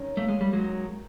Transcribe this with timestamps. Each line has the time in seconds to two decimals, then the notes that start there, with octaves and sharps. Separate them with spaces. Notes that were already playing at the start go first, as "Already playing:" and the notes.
Already playing: D#3 C#4
0.17 A3 A#3
0.28 G#3
0.41 G3
0.53 D#3 F#3 G#3